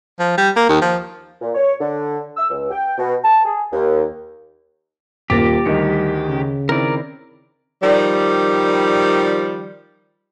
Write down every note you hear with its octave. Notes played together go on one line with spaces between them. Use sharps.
F3
G3
A#3
D#2
F3
A#2
C#5
D3
E6
C#2
G5
B2
A5
G#4
D#2
D#1 A#3 F4 G4 D6 A6 A#6
D2 D#3 G3 A#4 D#5 C#7
C#3
D#3 C4 E4 A#4 D5
D#3 F3 G3